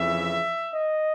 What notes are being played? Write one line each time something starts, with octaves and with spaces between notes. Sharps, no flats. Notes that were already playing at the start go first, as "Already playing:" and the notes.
Already playing: F2 C#3 E3 E5
D#5